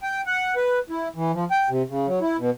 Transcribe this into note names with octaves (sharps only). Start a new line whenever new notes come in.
G5
F#5
B4
E4
E3
F3
G5
C3
C#3
F#3
E4
B2